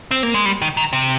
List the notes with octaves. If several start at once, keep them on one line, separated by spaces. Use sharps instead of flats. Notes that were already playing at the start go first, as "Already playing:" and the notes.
C4
A#3
G#3
G3
D#3
D#3
C3